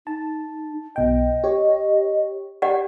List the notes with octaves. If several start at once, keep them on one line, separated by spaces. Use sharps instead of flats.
D#4 A5
B1 B2 D#5 G5
G4 C#5
G4 D5 F#5 G5